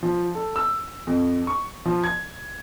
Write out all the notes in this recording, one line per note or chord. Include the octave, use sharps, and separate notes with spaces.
F3
A4
E6
F2
C#6
F3
G#6